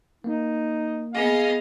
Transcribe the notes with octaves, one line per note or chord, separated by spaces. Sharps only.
A#3 D#4
B3 G#4 D#5 F5